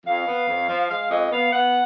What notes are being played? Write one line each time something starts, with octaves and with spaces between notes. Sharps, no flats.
F2 F5
B3
F2
F3
G#3 F5
F2 D#5
B3 F5
B3 F#5